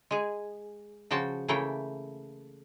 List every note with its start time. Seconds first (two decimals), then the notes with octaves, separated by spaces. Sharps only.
0.11 G#3 G#4
1.11 C#3 F3 F#4 G5 A5
1.48 C#3 E3 A3 A#3 C#5 G5